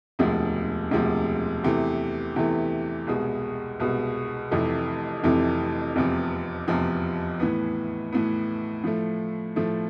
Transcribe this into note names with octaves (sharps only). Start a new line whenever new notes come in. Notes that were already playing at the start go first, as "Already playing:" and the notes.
E1 D2 C3 F3 G#3
E1 D2 C3 F3 G#3
E2 C3 E3 A3
E2 C3 E3 A3
C2 B2 G#3
C2 B2 G#3
F1 F2 C3 E3 A3
F1 F2 C3 E3 A3
F1 E2 C3 F3
F1 E2 C3 F3
A2 E3 B3
A2 E3 B3
A2 F3 A3
A2 F3 A3